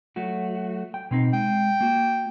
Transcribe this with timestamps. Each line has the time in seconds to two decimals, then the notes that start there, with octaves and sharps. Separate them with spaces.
0.16 F#3 A3 F#4
0.94 G5
1.11 B2 C4 D#4
1.33 G#3 G5
1.81 A#3 F#4